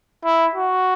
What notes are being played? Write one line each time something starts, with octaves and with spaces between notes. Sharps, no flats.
E4
F#4